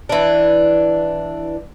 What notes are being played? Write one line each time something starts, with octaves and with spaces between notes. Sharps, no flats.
E3 D4